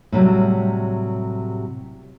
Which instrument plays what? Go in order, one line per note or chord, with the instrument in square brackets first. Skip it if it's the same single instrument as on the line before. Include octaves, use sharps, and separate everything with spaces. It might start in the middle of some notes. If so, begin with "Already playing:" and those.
[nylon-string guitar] A2 C3 F#3 G3